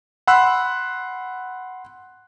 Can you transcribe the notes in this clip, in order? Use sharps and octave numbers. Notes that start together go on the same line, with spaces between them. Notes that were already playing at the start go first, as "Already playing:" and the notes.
F#5 B5 C6 E6 F#6